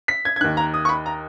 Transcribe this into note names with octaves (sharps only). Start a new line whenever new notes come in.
B6
G#6
G#6
D#2 D#3 F#6
A#5
D#6
C#6
B5
A#5